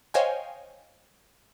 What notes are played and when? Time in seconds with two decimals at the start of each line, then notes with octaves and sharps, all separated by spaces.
0.14 C5 C#5 D#5 F5 G5 G#5